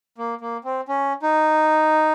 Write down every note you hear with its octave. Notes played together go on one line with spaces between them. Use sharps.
A#3
A#3
C4
C#4
D#4